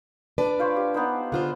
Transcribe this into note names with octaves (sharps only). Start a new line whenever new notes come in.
D4 B4 D5 A5
F4 C5 C#5
G4
B3 D#4 C5
D3 F4 C5 F#5